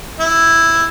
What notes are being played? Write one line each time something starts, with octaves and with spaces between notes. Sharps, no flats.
E4